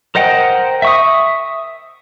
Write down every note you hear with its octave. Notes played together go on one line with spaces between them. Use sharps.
A#4 C5 D#5 F#5 G5
E5 C#6 D#6